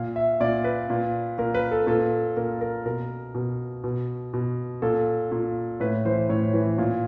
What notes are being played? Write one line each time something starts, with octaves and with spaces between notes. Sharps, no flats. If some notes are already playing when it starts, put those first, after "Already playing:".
Already playing: A#2 F5
E5
A#2 D5
B4
A#2
A#2 A#4
B4
A4
A#2 A4
A#2 A#4
A#4
B2 A#4
B2
B2
B2
A#2 A4
A#2
A2 B4
E3 C5
A2 C#5
E3
A#2